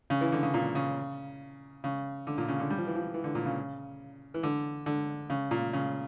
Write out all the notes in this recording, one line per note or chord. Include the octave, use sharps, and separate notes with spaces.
C#3
E3
D3
C#3
A#2
C#3
C#3
D3
A#2
C#3
D3
G3
F3
E3
F3
E3
D3
A#2
C#3
E3
D3
D3
C#3
A#2
C#3